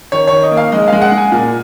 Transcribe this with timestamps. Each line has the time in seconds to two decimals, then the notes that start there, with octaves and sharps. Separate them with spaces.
0.12 D#3 C#5
0.28 D#3 C#5
0.43 D#5
0.51 A#3
0.57 F5
0.72 G#3 D#5
0.88 G#3 F5
1.02 F#5
1.12 G#3
1.17 G#5
1.32 A#2